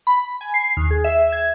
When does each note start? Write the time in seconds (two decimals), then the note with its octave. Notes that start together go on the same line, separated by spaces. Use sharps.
0.07 B5
0.41 G#5
0.54 C7
0.77 D#2
0.91 G#4
1.04 E5
1.32 G#6